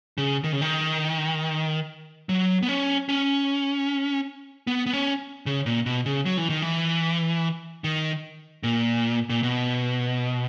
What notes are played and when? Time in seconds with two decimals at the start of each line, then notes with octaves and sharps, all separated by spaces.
0.18 C#3
0.44 D#3
0.53 C#3
0.61 D#3
2.29 F#3
2.63 B3
2.69 C#4
3.09 C#4
4.67 B3
4.86 B3
4.93 C#4
5.46 C#3
5.66 A#2
5.86 B2
6.06 C#3
6.26 F#3
6.38 E3
6.50 D#3
6.62 E3
7.84 D#3
8.63 A#2
9.30 A#2
9.43 B2